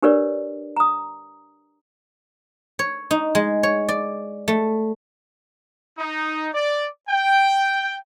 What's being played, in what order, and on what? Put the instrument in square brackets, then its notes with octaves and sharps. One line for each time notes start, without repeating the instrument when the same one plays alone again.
[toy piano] D4 G4 A#4 B4 C#5 D5
A#5 D#6
[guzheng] C#5
D#4
G#3
C#5
D5
A3
[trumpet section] D#4
D5
G5